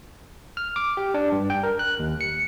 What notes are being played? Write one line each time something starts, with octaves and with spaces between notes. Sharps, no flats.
F6
D6
G4
D4
G2
G5
A#4
F#6
D#2
C#7